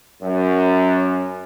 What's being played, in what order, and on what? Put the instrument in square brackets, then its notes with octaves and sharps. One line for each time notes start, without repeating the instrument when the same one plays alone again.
[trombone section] F#2